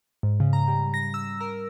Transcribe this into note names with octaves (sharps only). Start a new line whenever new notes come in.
G#2
C#3
A#5
G3
A#6
E6
A#4